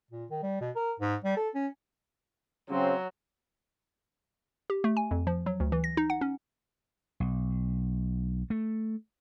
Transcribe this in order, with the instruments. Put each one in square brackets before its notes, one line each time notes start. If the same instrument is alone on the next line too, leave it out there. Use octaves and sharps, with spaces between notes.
[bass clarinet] A#2
D#3
G3
B2
A#4
G#2
G3
A4
C#4
[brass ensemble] C#3 C4 [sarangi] F#3
[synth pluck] G4
A3
G#5
F2
F3
F#3
D2
E3
A#6
D#4
F#5
C#4
[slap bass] B1
A3